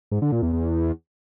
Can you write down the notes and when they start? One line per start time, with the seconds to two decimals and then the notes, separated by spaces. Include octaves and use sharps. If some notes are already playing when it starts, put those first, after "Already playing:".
0.11 G#2
0.22 D3
0.32 A#2
0.42 E2
0.53 E2